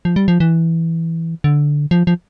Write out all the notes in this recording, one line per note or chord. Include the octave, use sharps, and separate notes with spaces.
F3
G3
F3
E3
D3
F3
F3